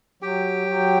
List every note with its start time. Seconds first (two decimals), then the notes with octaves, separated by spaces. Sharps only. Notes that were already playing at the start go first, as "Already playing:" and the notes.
0.22 F#3 G4 G5
0.68 F#3